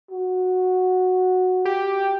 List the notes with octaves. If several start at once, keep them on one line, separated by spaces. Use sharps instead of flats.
F#4
G4